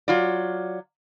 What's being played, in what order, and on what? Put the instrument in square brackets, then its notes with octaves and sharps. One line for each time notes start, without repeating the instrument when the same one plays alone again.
[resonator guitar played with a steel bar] F#3 F4 D5